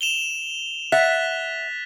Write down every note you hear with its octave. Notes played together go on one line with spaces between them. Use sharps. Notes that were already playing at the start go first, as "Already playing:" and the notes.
E7 F7 G7
E5 F#5 F#6 A6 B6